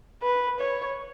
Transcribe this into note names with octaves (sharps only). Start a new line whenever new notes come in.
B4
C#5